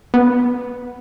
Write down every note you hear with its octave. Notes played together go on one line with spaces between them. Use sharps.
B3